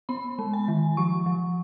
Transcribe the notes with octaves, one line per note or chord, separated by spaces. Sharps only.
B3 B5
G#3
G#5
D#3
F3 C#6
F3